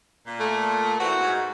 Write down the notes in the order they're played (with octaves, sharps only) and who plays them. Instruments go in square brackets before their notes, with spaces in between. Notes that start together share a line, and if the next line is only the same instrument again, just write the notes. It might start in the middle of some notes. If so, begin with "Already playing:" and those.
[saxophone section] A#2
[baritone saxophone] A3
[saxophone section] E3 C4 [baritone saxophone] F#4
[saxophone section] G#2